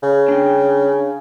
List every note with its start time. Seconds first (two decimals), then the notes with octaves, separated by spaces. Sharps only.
0.03 C#3
0.28 D4 G5